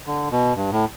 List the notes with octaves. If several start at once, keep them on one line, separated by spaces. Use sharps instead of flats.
D3
B2
G2
A2